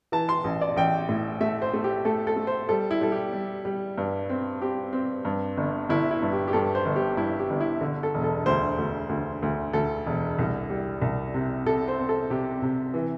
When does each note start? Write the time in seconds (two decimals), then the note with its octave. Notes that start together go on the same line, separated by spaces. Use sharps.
0.12 E3 A5
0.29 C6
0.44 A1
0.61 D5
0.76 A1 G5
1.09 A2
1.41 A3 E5
1.62 C5
1.74 A3
1.84 G4
2.05 A3 A4
2.27 A4
2.36 A3
2.47 C5
2.69 G3 A4
2.91 E4
3.01 G3 A4
3.12 G4
3.33 G3
3.65 G3
3.98 G2
4.29 C4
4.62 C4 G4
4.93 C4
5.25 G2
5.57 G1
5.89 G1 E4
6.11 E4
6.22 G2
6.33 G4
6.48 G4
6.53 G2 A4
6.75 C5
6.86 G1
6.96 G4
7.17 G2 E4
7.39 G4
7.50 G1
7.60 E4
7.81 D3
8.03 A4
8.14 E1
8.24 A4
8.46 D2 C5
8.78 D2
9.09 D2
9.42 D2
9.73 D2 A4
10.06 E1
10.39 C2
10.70 G3
11.02 C2
11.34 C3
11.66 C3 A4
11.88 C5
11.99 C4
12.09 A4
12.30 C3 G4
12.62 C3
12.94 E3